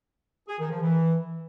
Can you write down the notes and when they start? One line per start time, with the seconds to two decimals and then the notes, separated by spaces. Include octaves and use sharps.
0.48 G#4
0.60 D#3
0.71 F3
0.82 E3